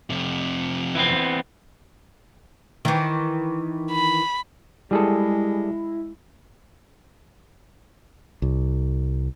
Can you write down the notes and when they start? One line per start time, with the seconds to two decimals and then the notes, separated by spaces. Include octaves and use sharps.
0.10 F2 C3
0.95 E3 B3 C4
2.85 D#3 E3
3.92 B5
4.91 G3 G#3 E4 G#4 A4
8.42 C2